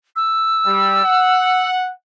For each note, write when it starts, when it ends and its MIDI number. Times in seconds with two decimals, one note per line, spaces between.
0.16 1.68 88
0.66 1.02 55
1.04 1.91 78